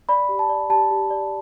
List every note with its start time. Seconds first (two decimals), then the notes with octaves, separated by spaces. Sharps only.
0.09 D5 B5
0.29 G4
0.39 A5
0.49 D5
0.70 G4 A5
0.91 G4
1.10 D5